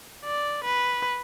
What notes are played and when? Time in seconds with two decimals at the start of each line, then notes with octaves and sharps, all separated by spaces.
0.24 D5
0.64 B4